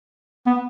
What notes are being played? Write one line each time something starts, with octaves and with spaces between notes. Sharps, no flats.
B3